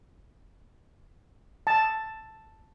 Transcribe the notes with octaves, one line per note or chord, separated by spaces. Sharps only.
A5